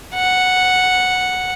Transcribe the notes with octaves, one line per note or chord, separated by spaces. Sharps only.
F#5